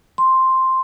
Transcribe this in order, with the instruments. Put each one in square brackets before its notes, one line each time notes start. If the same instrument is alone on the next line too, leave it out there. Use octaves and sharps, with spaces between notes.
[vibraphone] C6